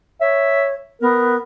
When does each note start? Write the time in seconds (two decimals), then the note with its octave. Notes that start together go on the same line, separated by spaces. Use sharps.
0.21 C#5 E5
1.01 B3 A#4